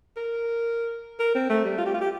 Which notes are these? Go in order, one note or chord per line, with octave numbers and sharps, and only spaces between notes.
A#4
A#4
C4
A3
G3
F4
G4
F4
G4